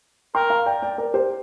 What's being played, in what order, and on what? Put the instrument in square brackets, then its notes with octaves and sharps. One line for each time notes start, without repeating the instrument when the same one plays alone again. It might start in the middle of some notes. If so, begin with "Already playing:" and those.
[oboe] A#4 [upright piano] G5 C6
[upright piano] F5 A#5
D5 G5
D5 G5
A#4 D5
G4 C5